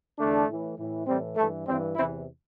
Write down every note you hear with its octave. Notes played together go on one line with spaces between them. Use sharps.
E2 D3 A3 D4
A2 E3
A2 E3
A2 E3 G3 C4
G2 E3 A3
G2 E3 G3 C4
E2 C3 E3 C4 E4